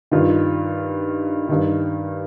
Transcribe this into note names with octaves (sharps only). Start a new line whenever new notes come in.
G2 D#3 F4
G2 D#3